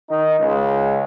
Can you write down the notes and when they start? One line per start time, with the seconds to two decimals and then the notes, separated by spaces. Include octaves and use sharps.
0.11 D#3 D#4
0.40 C#2 G#3